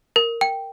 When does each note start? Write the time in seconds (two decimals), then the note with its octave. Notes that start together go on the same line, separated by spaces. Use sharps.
0.16 A#4
0.41 G5